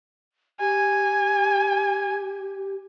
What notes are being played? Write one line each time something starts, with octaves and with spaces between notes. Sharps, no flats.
G4 G#5